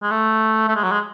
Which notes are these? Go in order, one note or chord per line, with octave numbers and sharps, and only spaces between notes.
G#3
A3
A3
G#3
F#3
G#3